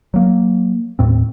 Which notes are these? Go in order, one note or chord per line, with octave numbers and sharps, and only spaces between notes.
F#3 A#3
D#2 A2 C4